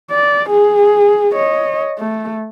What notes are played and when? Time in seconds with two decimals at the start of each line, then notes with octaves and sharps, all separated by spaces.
0.11 D5
0.50 G#4
1.34 C#5 D#5
1.99 A3